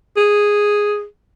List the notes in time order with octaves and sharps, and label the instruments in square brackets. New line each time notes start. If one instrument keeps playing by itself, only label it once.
[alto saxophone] G#4